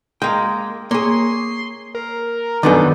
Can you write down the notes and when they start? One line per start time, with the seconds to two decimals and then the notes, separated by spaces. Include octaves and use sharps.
0.22 G#3 A#3 G5
0.91 A#3 G#4 C#5 C6
1.95 A#4
2.63 F#2 D#3 B3 D4 D#4 A4 D5